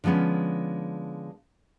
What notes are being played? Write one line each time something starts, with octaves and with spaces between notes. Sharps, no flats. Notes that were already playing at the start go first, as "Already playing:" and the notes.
D3 F3 G#3 B3 C#4